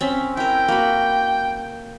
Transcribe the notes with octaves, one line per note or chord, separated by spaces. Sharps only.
C4 C#4 E5
E4 A#4 G5
A#3 F#4 B5